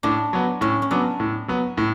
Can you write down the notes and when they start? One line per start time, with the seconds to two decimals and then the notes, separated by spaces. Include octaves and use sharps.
0.03 A2 D4
0.33 F#3 B3
0.61 A2 C#4
0.82 C#4
0.91 F#3 B3 D4
1.20 A2
1.48 F#3 B3
1.77 A2